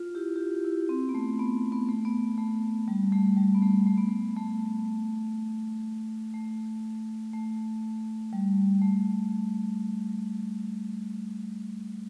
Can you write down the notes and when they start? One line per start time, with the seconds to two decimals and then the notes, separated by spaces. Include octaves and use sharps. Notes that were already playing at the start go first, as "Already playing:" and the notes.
Already playing: F4
0.15 E4 G4
0.36 G4
0.40 F4
0.65 E4
0.89 C4
1.09 B3
1.15 A3
1.39 B3
1.72 B3
1.89 A3
2.05 B3
2.38 A3
2.88 G3
3.12 A3
3.37 G3
3.54 B3
3.62 A3
3.86 A3
3.97 B3
4.09 A3
4.37 A3
6.34 A3
7.33 A3
8.33 G3
8.82 A3